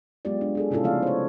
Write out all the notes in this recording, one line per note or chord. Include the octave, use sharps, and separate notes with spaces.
F#3 G#3 B3 F4 G4 D5
D4
D4 G#4 A4
C3 C#4 E4 F4 A4
C#3 F3 A3 B3 D5 F5
C5 C#5